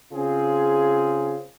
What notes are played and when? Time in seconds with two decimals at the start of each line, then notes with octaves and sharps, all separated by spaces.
0.12 C#3 C4 F4 G#4